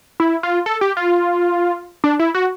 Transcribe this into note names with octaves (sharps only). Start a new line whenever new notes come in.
E4
F4
A4
G4
F4
D4
E4
F#4